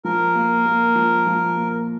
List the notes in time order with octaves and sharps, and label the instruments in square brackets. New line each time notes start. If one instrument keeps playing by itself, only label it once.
[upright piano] F3 [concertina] A#4
[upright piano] A#3
A#3
F3
F3
A#3